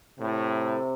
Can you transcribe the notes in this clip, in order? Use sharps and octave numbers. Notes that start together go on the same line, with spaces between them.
A2 C3